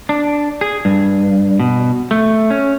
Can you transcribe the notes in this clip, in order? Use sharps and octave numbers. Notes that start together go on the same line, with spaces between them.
D4
G#4
G2
B2
A3
C#4